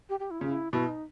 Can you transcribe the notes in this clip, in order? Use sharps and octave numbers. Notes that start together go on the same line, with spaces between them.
G4
G4
E4
C#3 F4
E4
B2 E4
D#4